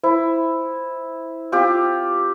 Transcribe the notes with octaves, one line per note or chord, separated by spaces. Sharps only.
E4 C5
C4 F4 G4